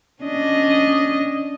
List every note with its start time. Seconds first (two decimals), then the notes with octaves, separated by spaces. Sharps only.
0.23 C#4 D4 D#5